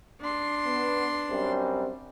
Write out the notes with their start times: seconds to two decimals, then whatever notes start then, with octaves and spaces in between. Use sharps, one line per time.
0.21 D4 C6
0.65 B3
1.31 F#2 G3 C4